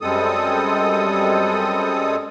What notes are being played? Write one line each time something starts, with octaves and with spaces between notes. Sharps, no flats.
F#2 G3 G#3 C4 A4 D#6